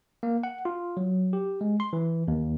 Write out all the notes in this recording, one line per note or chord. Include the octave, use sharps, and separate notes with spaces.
A#3
F#5
F4
F#3
G4
G#3
C6
E3
D#2